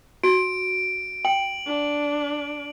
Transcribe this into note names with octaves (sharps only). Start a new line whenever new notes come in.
F#4 D7
G5 F#7
D4